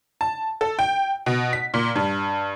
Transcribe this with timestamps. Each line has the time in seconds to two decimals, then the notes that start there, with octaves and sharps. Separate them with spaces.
0.21 A5
0.61 A4
0.79 G5
1.26 B2
1.53 B6
1.74 A#2
1.96 G2